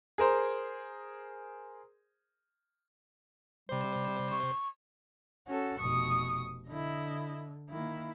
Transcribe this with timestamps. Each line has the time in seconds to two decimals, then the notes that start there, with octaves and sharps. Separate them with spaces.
0.18 G#4 A#4 C5
3.69 C3 G3 C5
4.31 C#6
5.47 C#4 F#4 A4
5.80 F1 B2 C#6 D#6
6.68 D3 E4 D#5
7.70 D#3 A#3 E4